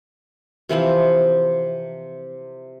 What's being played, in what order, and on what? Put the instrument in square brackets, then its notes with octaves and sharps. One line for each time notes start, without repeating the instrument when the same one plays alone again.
[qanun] C3 E3 F3 C4